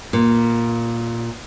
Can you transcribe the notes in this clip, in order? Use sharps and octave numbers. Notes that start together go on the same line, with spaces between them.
A#2